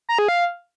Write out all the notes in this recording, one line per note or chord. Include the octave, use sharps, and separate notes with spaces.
A#5
G#4
F5